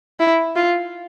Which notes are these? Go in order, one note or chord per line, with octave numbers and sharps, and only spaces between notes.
E4
F4